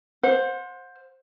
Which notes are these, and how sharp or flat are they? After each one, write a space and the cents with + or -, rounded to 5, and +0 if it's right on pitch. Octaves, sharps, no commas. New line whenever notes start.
C5 +10 F#5 -35